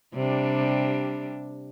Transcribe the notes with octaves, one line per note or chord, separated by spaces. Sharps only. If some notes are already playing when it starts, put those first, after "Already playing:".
C3 G3 D4